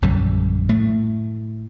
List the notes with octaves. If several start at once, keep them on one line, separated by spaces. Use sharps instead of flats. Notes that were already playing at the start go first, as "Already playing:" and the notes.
A#1 F#2 D3 G3
A2 A3